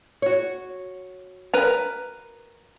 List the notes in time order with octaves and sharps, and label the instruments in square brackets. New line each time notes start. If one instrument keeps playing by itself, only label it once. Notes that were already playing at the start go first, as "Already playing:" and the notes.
[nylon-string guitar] F#4 C#5
[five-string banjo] A#4 B4 A#5